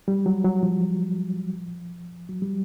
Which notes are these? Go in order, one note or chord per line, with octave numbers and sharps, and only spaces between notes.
G3
F#3
F#3
F3
F#3
G3